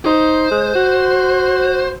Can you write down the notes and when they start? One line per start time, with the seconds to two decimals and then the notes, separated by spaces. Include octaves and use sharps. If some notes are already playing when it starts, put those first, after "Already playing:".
0.06 D#4 C5
0.51 G#3
0.75 F#4